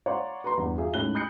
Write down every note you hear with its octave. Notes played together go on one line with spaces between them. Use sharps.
C#5 D5 F5 F#5 A#5 C6
B4 A#5 C6
E2 G2
F4 F#4 G#4 E5 F5
A2 G#3 C#4 D#4 F#6 G7
B5 D#6 F#6 G6 C7 C#7